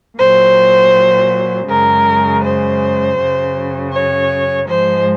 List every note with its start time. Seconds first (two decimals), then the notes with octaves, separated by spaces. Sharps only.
0.18 A#2 F#3 C5
1.68 F#2 C#3 G#3 A#4
2.44 C5
3.18 F#2 C#3 F#3
3.93 C#5
4.67 G#2 F3 G#3 C5